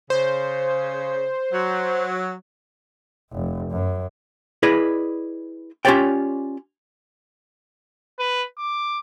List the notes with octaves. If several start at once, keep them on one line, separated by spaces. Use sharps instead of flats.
C#3 C5
F#3
F1
F#2
E4 G#4 B4 D5 D#5
C#4 F4 G4 C#5 D5 G5
B4
D6